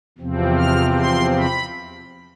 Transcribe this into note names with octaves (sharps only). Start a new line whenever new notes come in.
E2 C3 F3 C4
F6
C6
B5